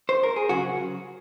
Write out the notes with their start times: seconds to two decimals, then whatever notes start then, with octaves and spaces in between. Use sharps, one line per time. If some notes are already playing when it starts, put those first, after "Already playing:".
0.09 C5
0.23 A#4
0.36 G#4
0.49 C#3 F#3 C#4 F#4